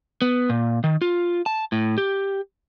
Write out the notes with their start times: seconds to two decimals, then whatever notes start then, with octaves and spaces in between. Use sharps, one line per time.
0.22 B3
0.49 A#2
0.84 D#3
1.02 F4
1.46 A5
1.72 A2
1.98 G4